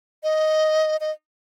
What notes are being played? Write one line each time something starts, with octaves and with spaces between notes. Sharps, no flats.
D#5
D#5